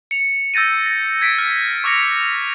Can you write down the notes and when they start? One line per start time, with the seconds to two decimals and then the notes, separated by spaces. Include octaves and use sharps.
0.11 C#7 F7
0.54 E6 G6 A6 A#6 D#7
0.86 A#6
1.21 G#6 B6 D7
1.39 F6
1.84 C#6 D6 F6 A#6 C#7